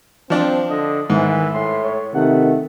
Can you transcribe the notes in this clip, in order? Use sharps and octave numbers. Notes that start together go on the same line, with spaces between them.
F3 C4 D4
D3 D#5
G#2 D#3 E3
A2 C6
C#5
C3 D#3 A3 F#5